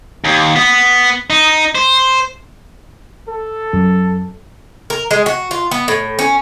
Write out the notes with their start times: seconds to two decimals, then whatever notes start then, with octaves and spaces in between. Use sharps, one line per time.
0.25 D#2
0.56 B3
1.30 D#4
1.75 C5
3.28 A4
3.73 F#2
4.90 A#4
5.11 G#3
5.26 F#4
5.51 F4
5.71 B3
5.88 A2
6.19 C#4